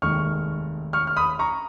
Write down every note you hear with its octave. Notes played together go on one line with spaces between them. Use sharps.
F1 D#2 D#3 G#3 C#6 F6
C#6 F6
F6
B5 D#6
A#5 C#6